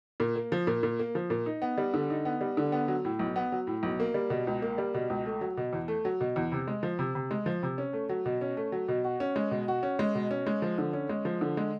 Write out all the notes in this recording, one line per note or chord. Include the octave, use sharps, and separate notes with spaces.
A#2
A#3
F3
A#2
A#2
A#3
F3
A#2
D#4
B3
G3
D3
D#4
B3
G3
D3
B3
F#3
A2
B1
B3
F#3
A2
B1
A#3
G3
B2
C#2
A#3
G3
B2
C#2
A3
F#3
B2
E2
A3
F#3
B2
E2
C3
G#3
F3
C3
C3
G#3
F3
C3
C#4
A3
F#3
B2
C#4
A3
F#3
B2
F#4
C#4
G#3
B2
F#4
C#4
G#3
B2
C#4
G#3
F3
D3
C#4
G#3
F3
D3
G#3